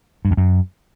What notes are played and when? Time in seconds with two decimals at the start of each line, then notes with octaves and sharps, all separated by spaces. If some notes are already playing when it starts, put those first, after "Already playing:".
0.25 G2
0.31 F2
0.37 F#2